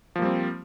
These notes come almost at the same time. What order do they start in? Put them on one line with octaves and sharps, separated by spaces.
F3 A#3 G3 C4